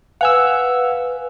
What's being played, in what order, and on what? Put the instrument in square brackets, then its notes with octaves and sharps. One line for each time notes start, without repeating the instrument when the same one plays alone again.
[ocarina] B4 [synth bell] F5 G#5 [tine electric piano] F#5 E6